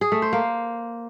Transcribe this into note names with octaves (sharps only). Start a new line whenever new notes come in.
G#4
A3
C5
A#3